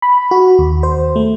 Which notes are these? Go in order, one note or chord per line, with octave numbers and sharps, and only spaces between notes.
B5
F#4
D#2
C5
A3